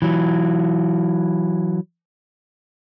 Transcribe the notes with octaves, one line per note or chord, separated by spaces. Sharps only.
E3 F#3